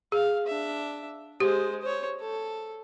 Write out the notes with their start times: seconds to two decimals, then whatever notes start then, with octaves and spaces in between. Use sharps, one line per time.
0.12 G#4 F5
0.47 D4 E5
1.40 G#3 G4 C5
1.82 C5 C#5
2.20 A4